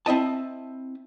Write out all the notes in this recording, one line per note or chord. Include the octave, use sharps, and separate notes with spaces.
C4 E4 D#5 A5